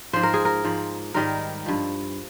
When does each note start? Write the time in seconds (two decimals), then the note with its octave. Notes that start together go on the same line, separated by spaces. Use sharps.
0.13 G#2 F3 C5
0.23 A#4
0.34 G#4
0.45 A#4
0.64 G#2 F3
1.14 G#2 D#3 G3 A#4
1.66 G2 F3